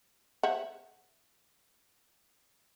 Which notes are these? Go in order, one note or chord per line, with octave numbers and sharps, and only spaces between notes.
C5 E5 F#5